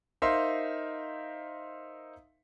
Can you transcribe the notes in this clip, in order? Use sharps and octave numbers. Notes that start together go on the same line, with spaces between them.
D#4 A#4 C5 E5 F5 C6